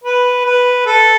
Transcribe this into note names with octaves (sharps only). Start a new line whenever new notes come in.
B4
B4
A4